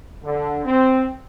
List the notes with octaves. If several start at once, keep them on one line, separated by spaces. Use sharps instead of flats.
D3
C4